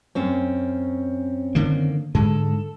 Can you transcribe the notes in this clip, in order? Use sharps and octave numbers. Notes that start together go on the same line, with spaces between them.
F#2 C4 C#4
D3 D#3 A#3
G#2 D3 G#3 A4